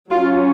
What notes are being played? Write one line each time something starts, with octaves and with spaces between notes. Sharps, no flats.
F#3 C#4 F4